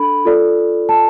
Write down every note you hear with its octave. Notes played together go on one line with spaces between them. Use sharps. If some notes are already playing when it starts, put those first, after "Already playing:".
Already playing: D4 A4 B5
F4 A4 D5
A5